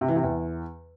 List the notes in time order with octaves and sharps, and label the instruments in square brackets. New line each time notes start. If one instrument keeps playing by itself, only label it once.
[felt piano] C3
E3
C3
E2